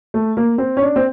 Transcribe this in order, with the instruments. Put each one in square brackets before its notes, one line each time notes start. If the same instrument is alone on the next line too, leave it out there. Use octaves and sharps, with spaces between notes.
[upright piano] A3
A#3
C4
C#4
D4
C4